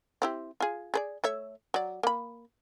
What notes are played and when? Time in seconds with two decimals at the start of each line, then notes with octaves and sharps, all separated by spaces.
0.22 C4 E4 G4
0.60 F4 G#4
0.94 G#4 B4 D5
1.24 A3 C#5 E5
1.74 F#3 D5
2.03 A#3 B5